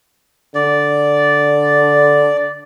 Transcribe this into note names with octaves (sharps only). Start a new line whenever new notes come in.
D3 D5